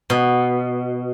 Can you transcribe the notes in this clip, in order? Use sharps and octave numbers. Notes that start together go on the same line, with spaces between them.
B2